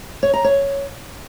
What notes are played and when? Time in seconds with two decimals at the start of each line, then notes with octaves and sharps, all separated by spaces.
0.23 C#5
0.34 A#5
0.44 C#5